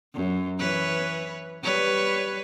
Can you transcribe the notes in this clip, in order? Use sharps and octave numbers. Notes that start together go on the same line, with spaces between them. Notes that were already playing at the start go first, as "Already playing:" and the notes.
F#2
E3 B4 C#5
G3 B4 C#5